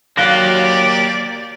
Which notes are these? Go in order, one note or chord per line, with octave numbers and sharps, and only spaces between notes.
F#3 A#3 G4 D5 F5 F#6 A#6